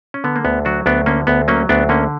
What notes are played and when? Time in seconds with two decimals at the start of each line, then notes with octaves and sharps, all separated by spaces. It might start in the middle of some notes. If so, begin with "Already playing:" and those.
0.14 C#4
0.24 D3 B3
0.36 A#3
0.45 D2 B3
0.65 F#3 D4 F#4
0.86 D2 B3 D4
1.06 D3 A#3 C#4
1.27 D2 B3
1.48 F#3 A#3 C#4
1.69 D2 B3 D4
1.89 D3 A#3 C#4